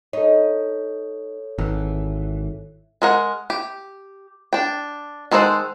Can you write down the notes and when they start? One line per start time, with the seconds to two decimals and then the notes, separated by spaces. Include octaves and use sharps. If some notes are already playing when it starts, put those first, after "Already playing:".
0.13 D#4 A4 C#5
1.58 G#1 E3
3.02 G#3 A#4 F#5
3.50 G4
4.53 D4 G5
5.31 D#3 G#3 A4 C5 F#5